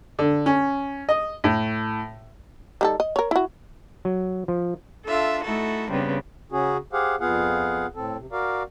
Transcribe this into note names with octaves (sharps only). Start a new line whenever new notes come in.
D3
C#4
D#5
A2
G3 D#4 A4
D#5
A#4 C#5
E4 F#4
F#3
F3
D4 F4 A4 E5
A3 D#4 E4 F#4 A4
G2 C#3 G3 B3 C4
C#3 C#4 F#4 G#4
G4 G#4 C5 F5 F#5
F2 B3 F4 G#4 F5 F#5
A2 C4 A4
C3
F#4 A#4 D5 F5